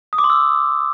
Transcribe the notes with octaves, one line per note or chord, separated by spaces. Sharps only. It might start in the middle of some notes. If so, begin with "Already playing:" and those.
D#6
D6
C6
E6